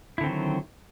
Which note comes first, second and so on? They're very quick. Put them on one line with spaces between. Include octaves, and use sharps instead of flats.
E4 D3 C4 D#3 F#3